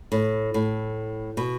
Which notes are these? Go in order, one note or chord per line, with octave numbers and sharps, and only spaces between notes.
A2
A2
B2